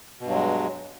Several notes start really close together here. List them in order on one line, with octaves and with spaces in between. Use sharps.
B2 G2 F#3 G#3